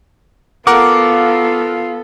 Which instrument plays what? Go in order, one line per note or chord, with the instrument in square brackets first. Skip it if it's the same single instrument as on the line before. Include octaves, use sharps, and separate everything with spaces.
[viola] B3 A4 [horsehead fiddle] F4 F5 [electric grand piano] A#4 F#5 [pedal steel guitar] D6